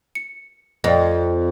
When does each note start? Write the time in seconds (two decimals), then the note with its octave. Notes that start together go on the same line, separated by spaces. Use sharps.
0.15 C#7
0.84 F2 D5 D#5